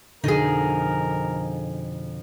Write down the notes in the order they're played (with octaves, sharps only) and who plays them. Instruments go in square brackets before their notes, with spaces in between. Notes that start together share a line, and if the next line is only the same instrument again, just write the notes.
[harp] F2 B2 [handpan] D3 [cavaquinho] D#4 G#4 [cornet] A#4